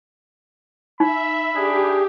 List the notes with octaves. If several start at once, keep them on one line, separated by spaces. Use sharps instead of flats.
D#4 E5 B5
D4 G4 G#4